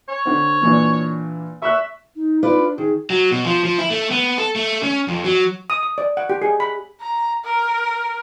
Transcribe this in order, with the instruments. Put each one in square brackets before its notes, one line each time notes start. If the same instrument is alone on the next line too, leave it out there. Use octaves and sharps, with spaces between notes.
[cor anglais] C#5
[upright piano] D3 C4
A#2 E3 D4
[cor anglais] E5 [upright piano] C#6 E6 F#6
[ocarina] D#4
[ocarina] D#4 [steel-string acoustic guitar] F4 B4 D5
[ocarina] D4
[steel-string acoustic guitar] D#3 [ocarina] G#4
[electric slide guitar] F#3
B2
F3
F3
E4
A3
B3
A4
A3
C#4
F2
F#3
[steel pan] D#6
D#6
D5
F#5
G4
G#4
B5
[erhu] A#5
A#4